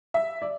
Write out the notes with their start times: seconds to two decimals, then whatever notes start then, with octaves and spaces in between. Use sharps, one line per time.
0.14 E5
0.42 D5